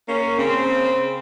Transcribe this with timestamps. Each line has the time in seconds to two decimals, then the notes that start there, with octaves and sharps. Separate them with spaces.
0.08 A#3 C#4
0.38 C#3 C4